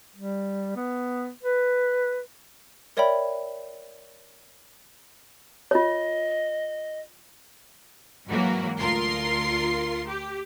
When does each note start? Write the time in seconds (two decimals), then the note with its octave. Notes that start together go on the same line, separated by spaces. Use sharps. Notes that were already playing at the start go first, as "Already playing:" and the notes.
0.16 G3
0.76 B3
1.43 B4
2.97 A#4 C#5 D5 E5 G5 B5
5.71 F4 C#5 D#5
8.27 G#2 E3 F#3 A#3 F#4
8.79 D2 F4 A#4 C6 C7
10.07 G4